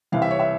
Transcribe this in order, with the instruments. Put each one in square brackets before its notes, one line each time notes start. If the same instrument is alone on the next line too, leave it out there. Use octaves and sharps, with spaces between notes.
[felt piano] C2 C3 E3 F5
E5
C#5
E5